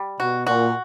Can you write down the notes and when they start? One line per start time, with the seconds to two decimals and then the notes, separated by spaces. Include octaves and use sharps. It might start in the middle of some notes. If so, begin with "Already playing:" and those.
Already playing: G3
0.19 B2 F#4
0.47 A#2 F#4